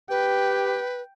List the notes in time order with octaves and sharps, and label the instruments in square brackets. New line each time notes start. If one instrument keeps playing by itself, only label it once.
[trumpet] G4 [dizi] B4 [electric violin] G5